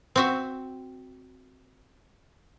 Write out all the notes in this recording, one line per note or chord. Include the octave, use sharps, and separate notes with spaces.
C4 F#4 E5